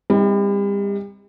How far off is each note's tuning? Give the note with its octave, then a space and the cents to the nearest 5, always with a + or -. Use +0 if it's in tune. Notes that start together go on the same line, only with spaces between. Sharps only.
G3 +35 C4 +0 D#4 +35